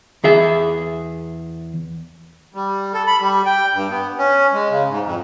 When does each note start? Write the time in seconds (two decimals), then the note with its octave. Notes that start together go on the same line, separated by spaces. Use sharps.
0.24 E2 G#4 E5
2.54 G3
2.94 A4
3.07 B5
3.20 G3
3.46 G5
3.74 G2
3.90 B3
4.18 C#4
4.53 G#3
4.70 C#3
4.89 G#2
5.04 F2